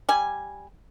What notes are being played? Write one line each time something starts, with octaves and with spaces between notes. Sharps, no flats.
G3 G#5